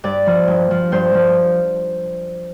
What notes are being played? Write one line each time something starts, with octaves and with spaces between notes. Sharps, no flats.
G2 D5
F3
G2
F3
G2 C5
F3